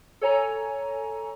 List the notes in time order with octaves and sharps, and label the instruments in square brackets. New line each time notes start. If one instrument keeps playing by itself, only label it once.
[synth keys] A4 C#5 G#5 A#5